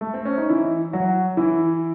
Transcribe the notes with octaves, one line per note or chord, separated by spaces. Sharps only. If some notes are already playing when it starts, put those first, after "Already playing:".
A3
C4
C#4
D#4
E3 E4
F#3 F#4
E3 E4